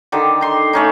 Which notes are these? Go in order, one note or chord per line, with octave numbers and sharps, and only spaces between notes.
D3 D#3 G4
D#4 C6
A3 C#4 D#4